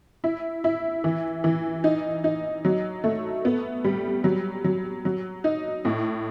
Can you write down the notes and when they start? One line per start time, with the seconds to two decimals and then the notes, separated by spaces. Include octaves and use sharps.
0.24 E4
0.64 E4
1.04 E3
1.44 E3
1.84 D#4
2.24 D#4
2.65 F#3
3.04 A3
3.45 B3
3.84 G3
4.24 F#3
4.64 F#3
5.05 F#3
5.44 D#4
5.85 A2